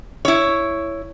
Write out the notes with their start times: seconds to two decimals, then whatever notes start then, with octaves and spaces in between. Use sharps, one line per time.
0.25 E4 C#5